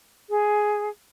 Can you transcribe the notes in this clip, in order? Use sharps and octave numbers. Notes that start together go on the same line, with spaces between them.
G#4